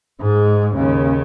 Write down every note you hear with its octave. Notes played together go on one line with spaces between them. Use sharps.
G#2 G#3
D#2 C#3